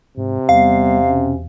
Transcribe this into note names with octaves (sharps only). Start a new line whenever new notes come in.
G#2 C3
E2 G3 B3 F5
B2 C#4